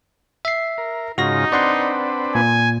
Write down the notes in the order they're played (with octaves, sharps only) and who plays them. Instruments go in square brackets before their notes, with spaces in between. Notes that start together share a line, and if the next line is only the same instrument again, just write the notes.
[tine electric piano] E5 C7
[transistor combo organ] A#4
[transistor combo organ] G#2 C#3 F4 [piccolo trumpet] D#4 [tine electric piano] F#4 A#6
[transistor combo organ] C4 D4 B4 [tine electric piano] D5 F#5 C6
[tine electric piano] A#2 [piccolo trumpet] G#5